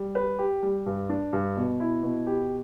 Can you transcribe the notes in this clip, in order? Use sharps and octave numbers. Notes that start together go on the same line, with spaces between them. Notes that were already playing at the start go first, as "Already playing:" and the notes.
Already playing: G3
B4
G4
G3
G2
D4
G2
B2
E4
B2
G4